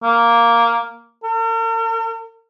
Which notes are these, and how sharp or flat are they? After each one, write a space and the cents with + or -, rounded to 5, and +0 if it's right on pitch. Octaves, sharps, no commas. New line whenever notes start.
A#3 +0
A#4 -45